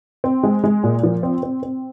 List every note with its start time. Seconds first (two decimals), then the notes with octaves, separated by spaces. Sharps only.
0.24 C4
0.43 G#3
0.64 G#3
0.84 A#2
1.03 F3
1.23 C4
1.43 C4
1.63 C4